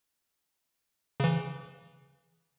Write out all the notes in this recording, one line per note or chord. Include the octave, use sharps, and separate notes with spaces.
C#3 E3